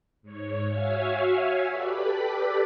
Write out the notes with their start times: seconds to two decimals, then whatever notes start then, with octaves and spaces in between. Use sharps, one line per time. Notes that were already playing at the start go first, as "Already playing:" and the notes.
0.22 G#2 C#5
0.69 F#4 C#5 E5 F5 G#5
1.70 G4 A4 B4 D5 B5